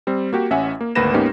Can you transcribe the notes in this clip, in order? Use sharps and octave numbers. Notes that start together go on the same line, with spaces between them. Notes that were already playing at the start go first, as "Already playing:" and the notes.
G3 C4
A#3 F#4 G4
A1 C#4 E5 F#5 G#5
A#3
G#1 D2 A#3 B4 A#6 E7
G#2 A#3 B3 C#4 D#4 G4